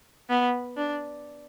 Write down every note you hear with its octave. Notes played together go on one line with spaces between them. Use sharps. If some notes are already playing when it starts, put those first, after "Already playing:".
B3
D4